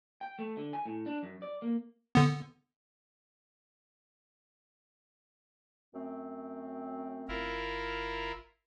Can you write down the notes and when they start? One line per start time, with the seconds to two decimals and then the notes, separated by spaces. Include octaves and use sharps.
0.21 G5
0.39 A3
0.57 D3
0.73 G#5
0.85 A2
1.06 D4
1.23 F#2
1.42 D5
1.62 A#3
2.15 D3 B3
5.94 F#2 A3 C4
7.28 G1 E4 F4 A#4